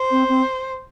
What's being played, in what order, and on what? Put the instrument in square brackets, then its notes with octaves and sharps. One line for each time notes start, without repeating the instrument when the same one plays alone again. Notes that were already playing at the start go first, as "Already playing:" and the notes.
Already playing: [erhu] C5
[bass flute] C4
C4